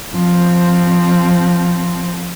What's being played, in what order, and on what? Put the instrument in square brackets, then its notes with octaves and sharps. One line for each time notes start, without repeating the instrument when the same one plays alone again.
[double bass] F3 C4